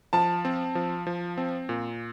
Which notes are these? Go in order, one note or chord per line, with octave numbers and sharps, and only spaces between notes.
F3 A5
C4
F3
F3
C4
A#2